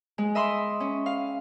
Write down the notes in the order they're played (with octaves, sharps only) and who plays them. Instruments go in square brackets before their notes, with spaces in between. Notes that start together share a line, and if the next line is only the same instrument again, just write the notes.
[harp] G#3
D#5 E5 B5 C6
C#4
F5